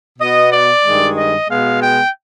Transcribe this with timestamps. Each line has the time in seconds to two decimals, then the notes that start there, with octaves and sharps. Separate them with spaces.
0.18 B2 B3 D#5
0.52 D5
0.83 G2 D#3 G#3
1.15 D#5
1.48 B2 G#3 B3 F5
1.80 G5